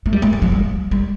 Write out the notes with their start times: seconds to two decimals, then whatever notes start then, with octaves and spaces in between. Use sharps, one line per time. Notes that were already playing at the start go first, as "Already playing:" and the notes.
0.06 A3
0.13 G3
0.22 A3
0.33 G3
0.42 F3
0.52 G3
0.91 G3